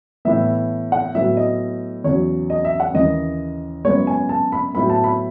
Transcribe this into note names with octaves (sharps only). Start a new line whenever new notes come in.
A2 E3 B3 E5
F#5
A2 F#3 B3 E5
D#5
E2 C#3 F#3 C#5
D#5
E5
F#5
D#2 C#3 E3 D#5
F#2 C#3 G#3 B3 C#5
G#5
A5
B5
A2 F#3 B3 B5
A5
B5